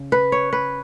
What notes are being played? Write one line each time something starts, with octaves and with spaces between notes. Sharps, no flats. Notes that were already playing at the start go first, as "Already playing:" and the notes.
Already playing: C#3
B4
C#5
B4